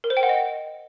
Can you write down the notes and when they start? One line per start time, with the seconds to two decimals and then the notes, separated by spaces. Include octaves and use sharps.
0.04 A#4
0.10 C5
0.17 G5
0.23 F#5
0.29 D#5